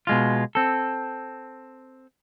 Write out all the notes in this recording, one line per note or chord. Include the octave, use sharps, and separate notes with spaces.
B2 G#3 F4
C4 A4